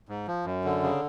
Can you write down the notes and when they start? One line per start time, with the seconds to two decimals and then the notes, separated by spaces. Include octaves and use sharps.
0.09 G#2
0.27 F3
0.45 F#2
0.64 D3
0.83 C#3